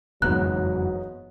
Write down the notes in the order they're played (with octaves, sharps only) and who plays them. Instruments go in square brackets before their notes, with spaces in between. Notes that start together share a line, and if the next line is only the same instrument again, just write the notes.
[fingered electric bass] F#1 F2 E3 [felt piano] G#2 B3 A#5 [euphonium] F#3 [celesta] F#6